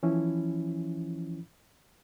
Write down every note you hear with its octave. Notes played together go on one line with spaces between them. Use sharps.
E3 F3 C#4 E4